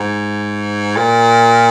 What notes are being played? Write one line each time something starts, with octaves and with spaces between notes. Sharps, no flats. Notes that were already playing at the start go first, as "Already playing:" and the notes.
Already playing: G#2
A#2